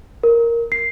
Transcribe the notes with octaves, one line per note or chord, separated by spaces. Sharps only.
A#4
C7